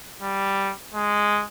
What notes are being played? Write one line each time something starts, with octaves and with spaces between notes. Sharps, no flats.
G3
G#3